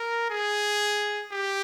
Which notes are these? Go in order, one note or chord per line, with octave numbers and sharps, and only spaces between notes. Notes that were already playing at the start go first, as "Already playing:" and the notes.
Already playing: A#4
G#4
G4